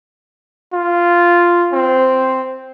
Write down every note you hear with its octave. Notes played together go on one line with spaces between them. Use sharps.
F4
C4